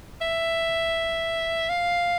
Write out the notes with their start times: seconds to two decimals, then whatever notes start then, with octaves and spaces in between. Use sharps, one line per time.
0.21 E5
1.69 F5